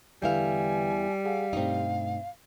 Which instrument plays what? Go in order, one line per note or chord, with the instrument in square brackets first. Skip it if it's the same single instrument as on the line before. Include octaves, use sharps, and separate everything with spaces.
[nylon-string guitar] E2 E4 F5 [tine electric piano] D3 B4 G6 [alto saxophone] G3 [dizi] G#5
[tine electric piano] G#4 F#5 G#5 [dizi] F5
[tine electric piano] G2 B2 A3 [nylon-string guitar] C4 D#4